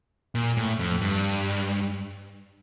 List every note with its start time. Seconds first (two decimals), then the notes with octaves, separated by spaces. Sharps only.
0.35 A#2
0.57 A2
0.79 F2
1.01 G2